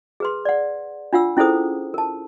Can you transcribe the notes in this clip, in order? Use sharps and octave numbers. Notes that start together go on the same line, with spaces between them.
G#4 B4 C6
D5 F#5
D4 F4 F#5 E6
C#4 E4 G#4 A4 C5 D#6
A#4 A5